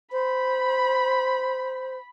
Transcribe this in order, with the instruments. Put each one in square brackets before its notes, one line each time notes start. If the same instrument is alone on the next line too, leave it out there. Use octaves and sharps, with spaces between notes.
[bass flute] C5 [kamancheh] B5